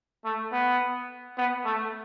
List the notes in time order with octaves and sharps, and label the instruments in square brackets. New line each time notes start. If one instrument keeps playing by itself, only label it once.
[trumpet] A3
B3
B3
A3